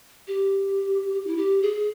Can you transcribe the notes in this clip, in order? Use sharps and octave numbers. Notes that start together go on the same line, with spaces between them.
G4
E4
G4
G#4